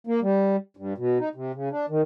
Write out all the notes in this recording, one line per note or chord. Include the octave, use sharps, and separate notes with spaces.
A#3
G3
G2
B2
D#4
C3
C#3
D4
D#3